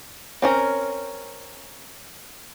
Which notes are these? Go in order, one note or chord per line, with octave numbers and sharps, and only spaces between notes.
C4 C#4 A#4